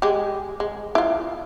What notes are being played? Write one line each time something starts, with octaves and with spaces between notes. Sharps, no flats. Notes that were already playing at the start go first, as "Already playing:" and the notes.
G#3 G4
G#3
E4 F4